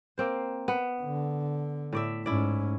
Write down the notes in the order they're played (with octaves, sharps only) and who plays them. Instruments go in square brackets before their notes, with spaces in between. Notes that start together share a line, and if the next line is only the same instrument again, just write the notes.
[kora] A#3 C4 C5
B3
[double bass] D3
[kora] A2 D5 E5
[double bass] G#2 C#4 [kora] E4 D5